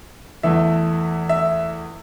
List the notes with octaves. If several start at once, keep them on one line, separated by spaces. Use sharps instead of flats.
E2 E3 A3 E5
E5